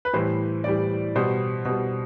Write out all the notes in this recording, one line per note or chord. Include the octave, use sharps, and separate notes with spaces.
B4
A2 E3 G3 C5
A2 E3 G3 D5
B2 G3 C5
B2 G3